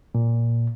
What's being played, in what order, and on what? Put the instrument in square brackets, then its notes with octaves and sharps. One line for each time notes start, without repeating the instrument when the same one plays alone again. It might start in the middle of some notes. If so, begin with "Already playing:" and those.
[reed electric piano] A#2